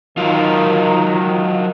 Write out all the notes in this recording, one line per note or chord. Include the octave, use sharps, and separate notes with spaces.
D#3 F#3 F4